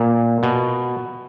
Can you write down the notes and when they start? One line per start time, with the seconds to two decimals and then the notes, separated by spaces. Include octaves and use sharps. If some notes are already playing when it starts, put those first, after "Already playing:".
Already playing: A#2
0.43 B2